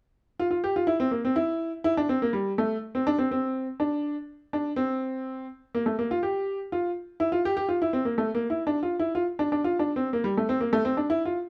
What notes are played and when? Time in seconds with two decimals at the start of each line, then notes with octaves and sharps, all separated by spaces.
0.39 F4
0.51 F4
0.64 G4
0.76 F4
0.87 E4
1.00 C4
1.11 A#3
1.25 C4
1.36 E4
1.84 E4
1.97 D4
2.09 C4
2.22 A#3
2.33 G3
2.58 A3
2.95 C4
3.07 D4
3.18 C4
3.31 C4
3.80 D4
4.53 D4
4.76 C4
5.75 A#3
5.86 A3
5.99 A#3
6.11 F4
6.23 G4
6.72 F4
7.20 E4
7.32 F4
7.45 G4
7.57 G4
7.69 F4
7.82 E4
7.93 C4
8.05 A#3
8.18 A3
8.35 A#3
8.50 E4
8.67 D4
8.83 F4
8.99 E4
9.15 F4
9.39 D4
9.52 D4
9.64 F4
9.79 D4
9.96 C4
10.13 A#3
10.24 G3
10.37 A3
10.49 C4
10.61 A#3
10.73 A3
10.85 C4
10.97 D4
11.10 E4
11.25 F4